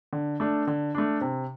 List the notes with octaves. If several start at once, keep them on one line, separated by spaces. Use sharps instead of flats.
D3
A3 D4
D3
A3 D4
C3